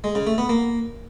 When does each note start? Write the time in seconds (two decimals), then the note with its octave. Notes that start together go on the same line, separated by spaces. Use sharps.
0.04 G#3
0.15 C#3
0.27 A3
0.38 B3
0.49 A#3